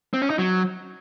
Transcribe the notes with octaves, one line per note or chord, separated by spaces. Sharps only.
C4
C#4
D#4
F#3